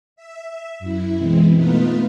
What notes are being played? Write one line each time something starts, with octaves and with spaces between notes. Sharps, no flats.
E5
F#2 E4
B2 E3 G#3 C4
A3 B3 D#4 F4 B4